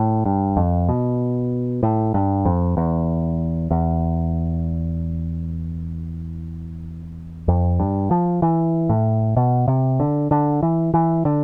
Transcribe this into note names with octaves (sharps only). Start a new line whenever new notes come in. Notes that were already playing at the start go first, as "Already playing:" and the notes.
Already playing: A2
G2
F2
B2
A2
G2
F2
E2
E2
F2
G2
F3
E3
A2
B2
C3
D3
D3
E3
E3
D3